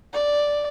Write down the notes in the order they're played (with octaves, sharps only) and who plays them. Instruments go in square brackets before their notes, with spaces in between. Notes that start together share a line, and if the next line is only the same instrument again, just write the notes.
[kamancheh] D5